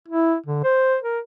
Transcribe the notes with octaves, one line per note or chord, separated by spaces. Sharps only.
E4
D3
C5
A#4